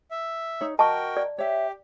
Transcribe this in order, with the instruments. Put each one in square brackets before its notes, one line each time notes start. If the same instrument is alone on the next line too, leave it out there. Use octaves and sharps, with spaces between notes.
[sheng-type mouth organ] E5
[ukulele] D#4 C#5
[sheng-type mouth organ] F#4 A#4 G5 [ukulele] D#5 [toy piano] A5 C#6
[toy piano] D5
[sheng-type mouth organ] G4 [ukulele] C#5 E5